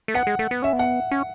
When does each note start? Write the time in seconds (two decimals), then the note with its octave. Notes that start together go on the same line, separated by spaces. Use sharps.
0.08 A3
0.14 B3 F#5
0.27 G#3
0.39 A3
0.51 B3
0.62 C#4 E5
0.73 B3
0.79 F#5
1.11 C#4